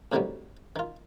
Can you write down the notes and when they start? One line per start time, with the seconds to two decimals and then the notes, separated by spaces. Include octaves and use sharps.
0.12 D2 A2 C3 D#3 F#3 G3
0.76 D#3 F4